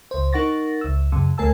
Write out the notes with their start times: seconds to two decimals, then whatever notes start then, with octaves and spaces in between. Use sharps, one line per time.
0.11 C#2 C5
0.33 D#4 A#4 F#5 C#6 A6 A#6
0.81 C#2 E6
1.12 F#2 C#3
1.38 D2 A3 A#4 G#5 A5 E6